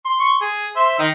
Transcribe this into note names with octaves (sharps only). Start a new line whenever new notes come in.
C6
C6 C#6
G#4
C5 E5
D#3 D#4